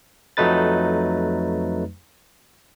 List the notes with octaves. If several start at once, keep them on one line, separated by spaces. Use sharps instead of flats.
F2 F#3 A3 D#4 B4 A6